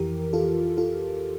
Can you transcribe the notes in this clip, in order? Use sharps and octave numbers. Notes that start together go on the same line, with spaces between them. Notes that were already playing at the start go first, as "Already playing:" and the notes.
Already playing: F2 E3 G4 A#4
F4 A4
F4 A4